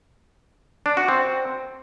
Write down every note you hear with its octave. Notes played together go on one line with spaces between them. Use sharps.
D4
F#4
C4